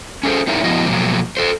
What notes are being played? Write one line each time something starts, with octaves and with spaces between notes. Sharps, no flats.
C#4 G#4 A4 C5
C4 D#4 E4 A#4 C#5
F3 B3 E4 F#4 D#5
B2 F3 F#3 A#3 C4
A4 C5